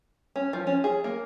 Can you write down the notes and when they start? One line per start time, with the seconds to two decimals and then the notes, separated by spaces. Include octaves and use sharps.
0.36 C#4
0.53 F3
0.67 C#4
0.84 G#4
1.04 A#3